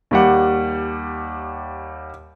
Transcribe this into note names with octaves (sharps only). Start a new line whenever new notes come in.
D#2 G3 F#5